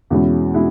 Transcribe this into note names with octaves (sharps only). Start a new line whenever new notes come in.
E2 B2 G#3 C#4 E4
B2 G#3 C#4 E4